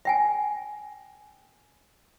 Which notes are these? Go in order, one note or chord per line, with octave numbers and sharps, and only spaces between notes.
E5 G5 G#5